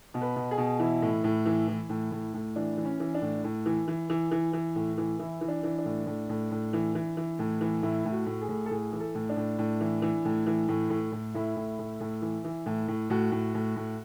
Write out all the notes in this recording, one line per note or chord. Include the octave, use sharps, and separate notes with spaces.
B2
B4
B2
G#4
B2
E3 E4
A2
A2
E3
E3
A2
A2
A2
E3 D4
E3
C#4
E3
D4
A2
A2
E3
E3
E3
E3
E3
A2
E3
E3 E4
E3
D4
E3
D4
A2
A2
A2
A2
E3
E3
E3
A2
E3
A2 E4
A2
F#4
A2
G#4
A2
A4
A2 G#4
E3
A4
A2
D4
A2
A2
E3
E3
A2
E3
A2
A2
A2
A2 E4
A2
A2
A2
E3
E3
A2
A2
A2 F#4
A2
A2
A2